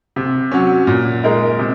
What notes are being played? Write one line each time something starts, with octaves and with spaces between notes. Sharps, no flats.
C3
F#3 C#4
A#2
G#3 D#4 A#4
C3